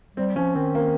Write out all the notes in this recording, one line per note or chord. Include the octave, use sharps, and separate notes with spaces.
G3 C4
F3 C#4
D#3 C4
A#3